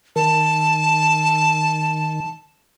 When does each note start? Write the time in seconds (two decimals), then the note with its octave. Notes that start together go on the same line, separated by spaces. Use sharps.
0.16 D#3 A5